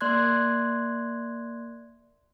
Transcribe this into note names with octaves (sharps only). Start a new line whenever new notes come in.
A#3 D5 C6 F#6 G#6